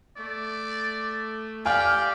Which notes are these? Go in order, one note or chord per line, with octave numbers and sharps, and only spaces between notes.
A3 D5
G4 D5 F5 G5 G#5 F6